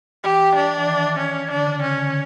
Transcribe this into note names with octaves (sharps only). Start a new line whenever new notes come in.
E3 G4
D4
E3
D#3
C#4
D3 D4
C#3
C#3 C#4
D3